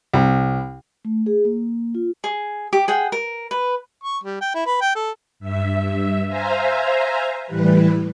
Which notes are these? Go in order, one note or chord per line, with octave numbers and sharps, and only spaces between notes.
C2
A3
G#4
A#3
F4
G#4
G4
G#4 F#5 G5
A#4
B4
C#6
G3
G5
E4
B4
G5
A4
G2 E5
C5 E5 F5 G#5 A#5
A2 E3 G3 B4